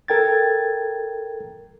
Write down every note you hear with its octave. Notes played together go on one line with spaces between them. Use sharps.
A4 A#4 G5 G#6 A6